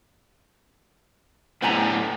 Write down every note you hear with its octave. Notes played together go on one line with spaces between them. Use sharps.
A2 D3 B3 C5 G#5 A#5